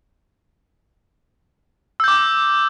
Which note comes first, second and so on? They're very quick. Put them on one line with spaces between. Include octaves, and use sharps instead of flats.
E6 G6 D6